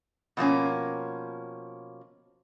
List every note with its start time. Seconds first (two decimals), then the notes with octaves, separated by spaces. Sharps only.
0.37 B2 F3 A#3 C#4